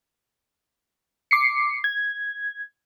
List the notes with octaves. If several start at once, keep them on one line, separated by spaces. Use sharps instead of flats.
D6 C7 C#7
G#6